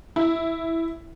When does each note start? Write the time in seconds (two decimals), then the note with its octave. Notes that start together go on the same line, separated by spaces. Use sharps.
0.16 E4